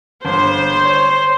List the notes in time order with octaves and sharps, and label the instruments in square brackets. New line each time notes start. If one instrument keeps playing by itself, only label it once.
[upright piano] G1 [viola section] C5
[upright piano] C#5